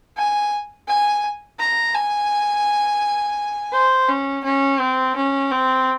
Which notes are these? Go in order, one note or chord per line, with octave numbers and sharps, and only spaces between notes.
G#5
G#5
A#5
G#5
C5
C#4
C#4
C4
C#4
C4